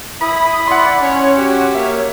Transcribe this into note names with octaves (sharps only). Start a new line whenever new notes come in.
E4 B5 D#6
E4 D5 F#5 C6
C#4 C#5
F#4 G4
A#3 C#5 E5